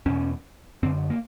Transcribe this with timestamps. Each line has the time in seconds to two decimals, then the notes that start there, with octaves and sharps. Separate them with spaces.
0.06 E2 B2 C#4
0.83 F#2 D3 C4
1.10 A#3